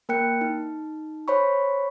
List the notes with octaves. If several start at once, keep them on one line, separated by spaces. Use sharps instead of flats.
A#3 A#4 G5 F#6 C#7
D#4
C5 C#5 B5 C#6